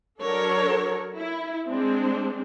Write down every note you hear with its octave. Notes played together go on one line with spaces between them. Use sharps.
F#3 D4 A4 A#4 C#5
E4
G#3 C4 D4